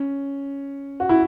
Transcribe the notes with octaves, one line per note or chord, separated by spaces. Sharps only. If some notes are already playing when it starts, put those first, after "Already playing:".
Already playing: C#4
F#4
E4